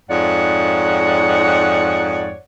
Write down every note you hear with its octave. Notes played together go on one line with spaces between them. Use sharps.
F2 G#2 D#4 C#5 D5 F#5